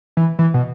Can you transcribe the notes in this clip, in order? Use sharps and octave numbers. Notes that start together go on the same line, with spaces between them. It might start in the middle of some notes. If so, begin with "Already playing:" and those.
E3
E3
B2